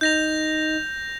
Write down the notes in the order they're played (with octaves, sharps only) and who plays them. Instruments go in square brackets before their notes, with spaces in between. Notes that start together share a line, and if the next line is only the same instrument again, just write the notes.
[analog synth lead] D#4 [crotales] G6 A#6 F7